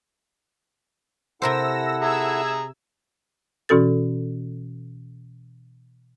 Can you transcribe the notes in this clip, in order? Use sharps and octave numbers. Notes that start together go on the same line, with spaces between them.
C3 E4 A4 A#4 C5 F#5 E6 A#6
G#4 E5 A#5 E6 G#6
B2 E3 C#4 F#4 A4 A6